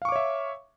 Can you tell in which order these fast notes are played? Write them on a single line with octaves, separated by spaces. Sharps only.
F5 C#6 D6 C#5 E5